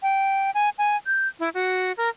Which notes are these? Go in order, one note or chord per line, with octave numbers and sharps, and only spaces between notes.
G5
G#5
G#5
G6
E4
F#4
A#4